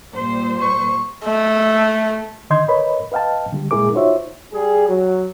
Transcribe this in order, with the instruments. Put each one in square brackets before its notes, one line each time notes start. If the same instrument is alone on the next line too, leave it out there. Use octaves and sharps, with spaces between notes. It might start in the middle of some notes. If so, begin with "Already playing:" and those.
[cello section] A#2 G3 C5
[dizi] C#6
[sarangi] A3
[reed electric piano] D3 D#3 D#5 C6 G6 G#6
A#4 B4 C#5 D#5 B5
B4 D#5 F5 G5 A5
D3 G3 G4
A#2 G#3 E4 G#4 A#4 D6
D#4 F4 F#4 C5 C#5 E5
[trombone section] G3 G#4
F#3